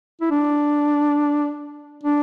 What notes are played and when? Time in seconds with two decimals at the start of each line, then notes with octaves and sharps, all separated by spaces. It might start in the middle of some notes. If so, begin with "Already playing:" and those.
0.21 E4
0.31 D4
2.04 D4